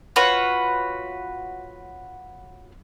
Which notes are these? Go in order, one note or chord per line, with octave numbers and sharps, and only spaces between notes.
F4 F#4 B4 C#5